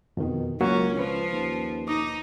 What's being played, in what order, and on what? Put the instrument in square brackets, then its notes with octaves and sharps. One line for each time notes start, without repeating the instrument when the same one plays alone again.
[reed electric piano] F2 D#3 [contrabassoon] B2
[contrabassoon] C#2 [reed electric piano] F#3 A#3 F#4 [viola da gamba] C#4
[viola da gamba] F3 [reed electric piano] C#4 B4
[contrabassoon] D#2
[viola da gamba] D#4 [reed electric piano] D6 D#6